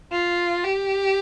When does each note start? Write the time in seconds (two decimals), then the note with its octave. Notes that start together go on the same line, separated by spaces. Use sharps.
0.12 F4
0.64 G4